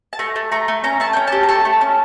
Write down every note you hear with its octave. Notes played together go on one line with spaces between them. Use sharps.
A5
A3 A#5
A3
A3 A#5
A3
C#4 A#5
A3 A5
C#4 G5
G4 A5
A#5
A3 A5
A3
C#4